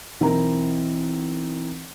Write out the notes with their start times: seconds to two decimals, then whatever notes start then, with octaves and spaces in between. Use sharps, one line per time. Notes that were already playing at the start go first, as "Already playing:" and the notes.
0.20 B1 E3 C4 A#4 A#5